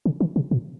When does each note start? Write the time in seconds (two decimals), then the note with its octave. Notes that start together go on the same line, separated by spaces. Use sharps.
0.05 C#3
0.20 D#3
0.36 C3
0.51 A#2